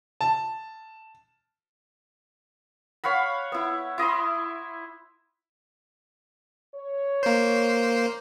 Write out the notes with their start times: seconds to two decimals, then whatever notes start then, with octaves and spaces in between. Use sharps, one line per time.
0.21 A5
3.04 C#5 F5 F#5 B5
3.52 B3 E4
3.98 E4 D#5 B5 C6
6.75 C#5
7.23 A#3 C5